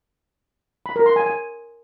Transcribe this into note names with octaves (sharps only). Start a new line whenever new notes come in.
B5
A#4
C6
G#5
G#5